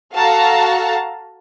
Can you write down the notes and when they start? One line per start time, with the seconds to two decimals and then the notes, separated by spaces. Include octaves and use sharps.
0.14 F#4 A4 F5 A5 A#5